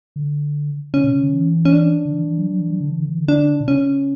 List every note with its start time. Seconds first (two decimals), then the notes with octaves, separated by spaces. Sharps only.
0.16 D3
0.94 C#3 C#4
1.04 B2
1.13 C#3
1.23 D3
1.33 E3
1.65 C#4
1.73 D4
2.05 D3
2.12 E3
2.24 E3
2.38 F#3
2.50 F#3
2.60 E3
2.70 F#3
2.80 D3
2.90 E3
2.99 D3
3.09 E3
3.19 D3
3.28 D4
3.60 B2
3.68 C#3 C#4